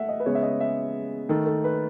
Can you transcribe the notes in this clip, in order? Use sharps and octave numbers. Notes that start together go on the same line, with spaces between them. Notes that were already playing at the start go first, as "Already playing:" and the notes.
Already playing: A3 E5 F#5
D#5
B4
C#3 G#3 B3 C#5
E5
D#5
E5
D#3 A3 A4
A4
B4